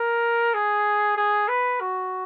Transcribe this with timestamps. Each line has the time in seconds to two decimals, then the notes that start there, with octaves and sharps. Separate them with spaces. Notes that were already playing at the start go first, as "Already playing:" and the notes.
Already playing: A#4
0.54 G#4
1.17 G#4
1.49 B4
1.81 F#4